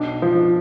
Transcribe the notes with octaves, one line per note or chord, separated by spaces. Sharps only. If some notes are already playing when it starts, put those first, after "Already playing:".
Already playing: B1 D4
F3